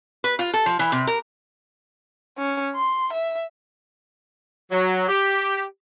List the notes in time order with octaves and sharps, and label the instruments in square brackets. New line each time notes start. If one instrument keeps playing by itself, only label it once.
[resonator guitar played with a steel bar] B4
F4
A4
F3
E3
C3
A#4
[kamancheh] C#4
C6
E5
[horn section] F#3
G4